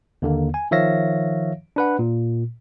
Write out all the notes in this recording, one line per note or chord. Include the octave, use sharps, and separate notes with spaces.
D#2 D3 A#3
G#5
D#3 F3 C#5 E5 F5 A#6
D4 B4 F#5
A#2